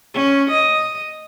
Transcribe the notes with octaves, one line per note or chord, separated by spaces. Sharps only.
C#4
D#5